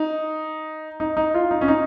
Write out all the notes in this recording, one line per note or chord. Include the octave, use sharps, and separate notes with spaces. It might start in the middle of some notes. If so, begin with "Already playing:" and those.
Already playing: D#4
D#4
D#4
F4
D#4
C#4
D#4